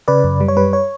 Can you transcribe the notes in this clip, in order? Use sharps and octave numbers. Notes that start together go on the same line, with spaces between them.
C#3 B4 D5
F#2
G3
C#5
G3 B4
C#5